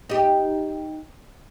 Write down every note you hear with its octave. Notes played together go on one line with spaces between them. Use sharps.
D#4 G4